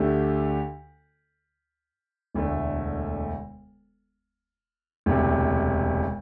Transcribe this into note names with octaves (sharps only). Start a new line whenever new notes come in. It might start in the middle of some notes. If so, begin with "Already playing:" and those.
Already playing: D2 D3 A3 D4 G4
E1 D2 D3 A3
E1 D2 C3